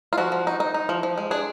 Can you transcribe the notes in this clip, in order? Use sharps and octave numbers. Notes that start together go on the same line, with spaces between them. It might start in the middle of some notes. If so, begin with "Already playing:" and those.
F4
F3 F#4
F3
D#4
D#4
D#4
F3
F3
G#3
D4 G#4